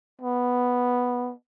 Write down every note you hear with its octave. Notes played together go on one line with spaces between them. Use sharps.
B3